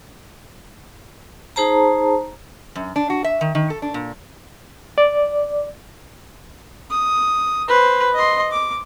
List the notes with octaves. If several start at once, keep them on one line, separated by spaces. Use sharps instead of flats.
D#4 G#4 C5 A5 A#5
F#2
D4
F#4
E5
D#3
D#3
A4
D4
A#2
D5
D#6
B4 C5
D#5 C6
D6